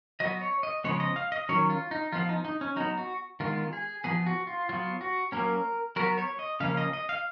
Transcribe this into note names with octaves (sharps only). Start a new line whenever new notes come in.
F#3 B3 D#5
C#5
D#5
C#3 F3 G#3 B3 C#5
D#5
F5
D#5
D#3 F#3 C#4 C#5
F4
D#4
F3 B3 F4
D#4
D#4
C#4
F#3 B3 D#4
F#4
D#3 G#3 B3 F4
G#4
F3 B3 G#4
F#4
F4
F#3 B3 F4
F#4
F#3 A#3 C#4 A#4
F#3 B3 A#4
C#5
D#5
C#3 F3 A#3 C#4 F5
D#5
D#5
F5